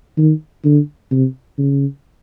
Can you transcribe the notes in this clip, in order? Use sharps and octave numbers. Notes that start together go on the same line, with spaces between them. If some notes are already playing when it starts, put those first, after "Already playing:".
D#3
D3
C3
C#3